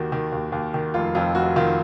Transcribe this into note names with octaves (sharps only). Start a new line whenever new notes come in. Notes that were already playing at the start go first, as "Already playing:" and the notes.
Already playing: D#2 D#3 F#4
D#3
D#2
D#2
D#3
F1 F4
F2 F4
F1 F#4
D#3 F4